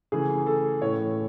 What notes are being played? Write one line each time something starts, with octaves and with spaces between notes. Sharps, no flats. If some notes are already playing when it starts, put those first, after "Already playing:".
C#3 E3 A3 G#4
A4
A2 E3 A3 C#5